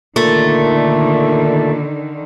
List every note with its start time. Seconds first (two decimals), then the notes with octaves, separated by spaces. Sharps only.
0.16 A#2 D3 D#3 A3